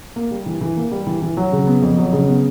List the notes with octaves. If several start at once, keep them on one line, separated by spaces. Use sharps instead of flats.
A#3
G3
E3
E3
A#3
G3
E3
E3
F#3
C#3
B3
F2
F#3
C#3
B3